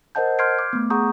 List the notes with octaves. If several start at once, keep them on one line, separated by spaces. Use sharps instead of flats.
A#4 C5 D#5 F#5 A5 G6
C6 F6 G6 G#6 C7 D7
D6
A3 B3
G#4 F#5 A#5 C#6 D#6 G6